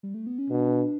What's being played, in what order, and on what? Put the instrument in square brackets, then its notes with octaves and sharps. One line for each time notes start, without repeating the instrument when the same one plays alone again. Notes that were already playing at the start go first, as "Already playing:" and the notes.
[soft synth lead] G3
A3
B3
C#4
[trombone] B2 [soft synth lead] D4